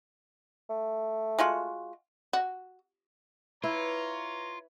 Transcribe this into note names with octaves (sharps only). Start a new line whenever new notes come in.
A3
G#3 F4 F#4
F#4
E4 F4 B4 C#5 A#5